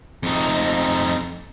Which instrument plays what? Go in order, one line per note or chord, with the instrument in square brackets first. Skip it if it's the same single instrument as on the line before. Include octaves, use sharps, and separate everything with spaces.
[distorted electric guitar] F2 D#4